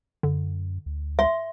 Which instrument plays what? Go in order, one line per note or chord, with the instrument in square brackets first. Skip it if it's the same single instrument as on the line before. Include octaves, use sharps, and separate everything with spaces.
[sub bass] F#2 [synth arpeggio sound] D3
[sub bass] D2
[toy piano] E5 [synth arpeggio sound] C6